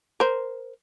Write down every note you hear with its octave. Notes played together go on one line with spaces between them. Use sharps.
A#4 C5